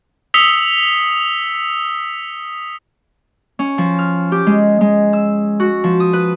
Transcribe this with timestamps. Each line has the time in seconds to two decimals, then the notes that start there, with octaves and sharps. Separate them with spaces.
0.34 D#6 E6 B6 C#7 F7 G7
3.59 C#4
3.78 F3
3.99 F6
4.32 G4
4.47 G#3
4.81 G#3
5.13 E6
5.60 F#4
5.84 F3
6.00 D#6
6.13 B4